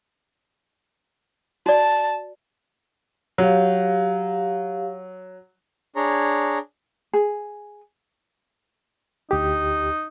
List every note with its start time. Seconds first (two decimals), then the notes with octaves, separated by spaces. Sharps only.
1.66 F#4 D5 A5
3.38 F#3 G4 F5
5.96 D4 G#4 C#5 A#5
7.13 G#4
9.31 D2 D#4 G4